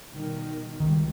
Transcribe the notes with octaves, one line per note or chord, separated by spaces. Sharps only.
B2 D#3 G3
C#2 B2 D#3 G3